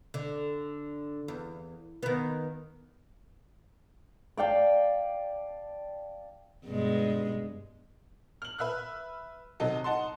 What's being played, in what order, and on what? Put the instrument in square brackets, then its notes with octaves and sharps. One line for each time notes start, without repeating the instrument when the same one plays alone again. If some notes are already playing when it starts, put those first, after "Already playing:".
[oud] D3
E2
D#3 B3
[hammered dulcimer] D5 F5 G5 A5
[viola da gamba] G2 B2 G#3
[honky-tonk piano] F6 F#7
B4 E5 F6 F#6
C3 F#3 D#4 A4
D#4 F#5 A5 C6